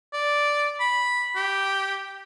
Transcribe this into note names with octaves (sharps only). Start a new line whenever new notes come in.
D5
B5
G4